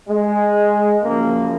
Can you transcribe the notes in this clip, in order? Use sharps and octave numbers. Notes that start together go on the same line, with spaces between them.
G#3
F#2 C#3 F3 A#3